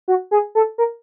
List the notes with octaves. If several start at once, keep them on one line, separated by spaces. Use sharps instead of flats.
F#4
G#4
A4
A#4